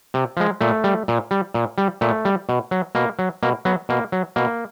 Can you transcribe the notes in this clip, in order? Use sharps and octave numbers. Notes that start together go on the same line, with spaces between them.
C3
F3 G#3
A#2 A3
G3
A#2
G3
A#2
G3
A#2 A3
G3
B2
F#3
B2 A#3
F#3
B2 A#3
F#3 B3
B2 A#3
F#3
B2 A#3